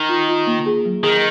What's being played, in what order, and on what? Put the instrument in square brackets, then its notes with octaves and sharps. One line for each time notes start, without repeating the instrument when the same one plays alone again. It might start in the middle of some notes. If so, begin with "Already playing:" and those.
Already playing: [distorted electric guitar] D#3
[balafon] F4
F4
A#3
G#4
F#3
[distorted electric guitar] D#3 [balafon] G#4